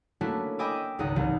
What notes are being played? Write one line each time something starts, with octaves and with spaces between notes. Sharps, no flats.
A3 A#3 C#4 D4 E4 F#4
D#5 G5 G#5 B5 D6 E6
G#1 C#2 D#4 F#5 D#6
C2 E3